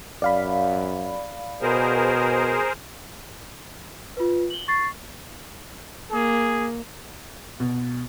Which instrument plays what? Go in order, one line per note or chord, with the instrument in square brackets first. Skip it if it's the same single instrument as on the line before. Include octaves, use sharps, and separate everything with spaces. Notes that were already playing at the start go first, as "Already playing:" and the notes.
[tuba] F#2 [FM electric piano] D5 F5 B5
[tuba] B2 [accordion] G#4 A#4 C5
[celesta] F4 B4
F#7 G7
C#6 A6 C7
[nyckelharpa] A#3 [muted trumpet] G#4
[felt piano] B2